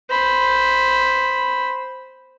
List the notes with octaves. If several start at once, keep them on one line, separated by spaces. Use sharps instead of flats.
C5 B5